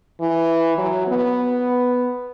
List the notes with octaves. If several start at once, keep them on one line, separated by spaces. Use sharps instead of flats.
E3
F#3
B3